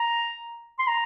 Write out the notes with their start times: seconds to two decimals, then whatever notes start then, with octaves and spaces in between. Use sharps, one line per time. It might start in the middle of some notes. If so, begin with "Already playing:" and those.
Already playing: A#5
0.79 C6
0.87 A#5